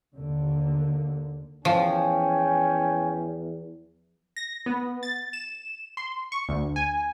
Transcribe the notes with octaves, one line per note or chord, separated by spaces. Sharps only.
D#2 D3
E2 F3 C#4 G5 G#5
A#6
B3
A6
E7
C6
C#6
D2
G#5